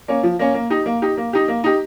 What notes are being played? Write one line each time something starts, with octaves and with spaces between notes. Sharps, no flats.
A#3 C#4
F3
A#3 C#4
A#3
D#4 G4
A#3
D#4 G4
A#3
D#4 G4
A#3
D#4 G4